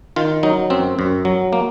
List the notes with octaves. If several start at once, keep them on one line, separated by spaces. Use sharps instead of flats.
D#3 F4
F#3 D#4
F#2 C4
F#2
F#3
A#3